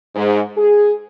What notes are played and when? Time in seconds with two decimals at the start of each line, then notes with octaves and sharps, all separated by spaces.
0.15 G#2
0.57 G#4